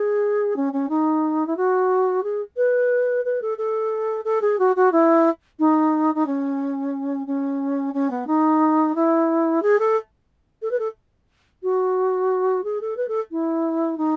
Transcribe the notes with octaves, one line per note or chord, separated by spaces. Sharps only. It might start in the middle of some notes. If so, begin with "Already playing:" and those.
Already playing: G#4
C#4
C#4
D#4
E4
F#4
G#4
B4
B4
A4
A4
A4
G#4
F#4
F#4
E4
D#4
D#4
C#4
C#4
C#4
B3
D#4
E4
G#4
A4
A4
B4
A4
F#4
G#4
A4
B4
A4
E4
D#4